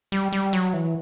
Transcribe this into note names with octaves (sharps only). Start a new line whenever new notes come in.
G3
G3
F#3
E3